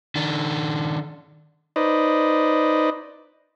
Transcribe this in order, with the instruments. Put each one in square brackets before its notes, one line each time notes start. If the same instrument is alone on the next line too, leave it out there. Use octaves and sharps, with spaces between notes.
[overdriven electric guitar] D#3 D4
[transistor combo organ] D#4 B4 C5 D5 D#5